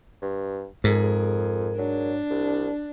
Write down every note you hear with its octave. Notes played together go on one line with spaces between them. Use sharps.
G2
F2 G#2 G#4 A#4
F#3 D4
C2